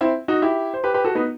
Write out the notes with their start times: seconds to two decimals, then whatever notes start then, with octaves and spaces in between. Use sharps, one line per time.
0.01 C4 E4
0.28 D#4 F#4
0.42 E4 G4
0.74 C5
0.84 G4 B4
0.94 G4 B4
1.04 F#4 A4
1.15 B3 D#4